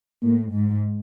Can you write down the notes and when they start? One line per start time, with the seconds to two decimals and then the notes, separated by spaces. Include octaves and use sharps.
0.23 A2 A#3
0.53 G#2